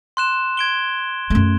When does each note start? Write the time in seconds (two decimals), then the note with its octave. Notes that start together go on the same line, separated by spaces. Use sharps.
0.17 C6 F#6 E7
0.57 G#6 D7 G7
1.30 F#2 A3